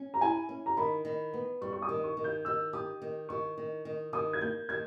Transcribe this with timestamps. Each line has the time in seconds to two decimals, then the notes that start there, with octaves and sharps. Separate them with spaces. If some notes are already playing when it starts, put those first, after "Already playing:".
Already playing: C#4
0.14 A#5
0.21 E4 G#5
0.49 C#4
0.66 A#5
0.77 D#3 B5
1.05 D#3
1.33 B3
1.62 G3 C#6
1.73 C#6
1.82 D#6
1.89 D#3
2.04 C#6
2.17 D#3
2.24 G6
2.45 D#3 E6
2.73 G4 D#6
3.02 D#3
3.29 D#3 C#6
3.58 D#3
3.85 D#3
4.13 D#3 D#6
4.33 G#6
4.41 A#3 G6
4.69 D#3 G#6